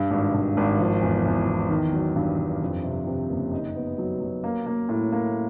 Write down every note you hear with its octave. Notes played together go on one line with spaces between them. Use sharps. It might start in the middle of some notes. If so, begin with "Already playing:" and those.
Already playing: G2
G#1
G2
G#1
F3
E2
E2
E2
D#3
F#3
G2
G2
F2
C3
C3
F#1
D#4
B3
F#3
F#3
A#3
A#3
A2
A#3